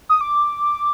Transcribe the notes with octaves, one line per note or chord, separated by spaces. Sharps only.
D#6
D6